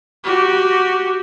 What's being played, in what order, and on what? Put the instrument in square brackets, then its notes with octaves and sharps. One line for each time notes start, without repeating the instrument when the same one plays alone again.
[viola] F#4 G4